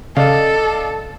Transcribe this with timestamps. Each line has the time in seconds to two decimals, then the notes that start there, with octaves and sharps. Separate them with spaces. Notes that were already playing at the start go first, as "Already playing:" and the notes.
0.17 C#3 A4 D5 D#5 F5